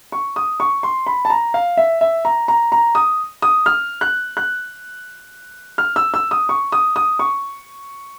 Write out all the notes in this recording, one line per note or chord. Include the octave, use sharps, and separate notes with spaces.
C#6
D#6
C#6
C6
B5
A5
A#5
F5
E5
E5
A#5
A#5
A#5
D#6
D#6
F6
F#6
F#6
F6
E6
E6
D#6
C#6
D#6
D#6
C#6